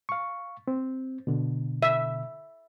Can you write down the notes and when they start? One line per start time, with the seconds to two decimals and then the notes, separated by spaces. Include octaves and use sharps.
0.09 F5 C#6
0.68 C4
1.27 B2 D3
1.83 E5